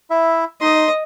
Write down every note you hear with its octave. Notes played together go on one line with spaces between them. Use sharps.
E4 E5
D#4 D#5 C6